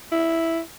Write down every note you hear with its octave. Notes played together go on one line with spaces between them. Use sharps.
E4